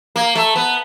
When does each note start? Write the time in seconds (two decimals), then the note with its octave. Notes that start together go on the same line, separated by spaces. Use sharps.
0.16 A#3
0.35 A3
0.56 B3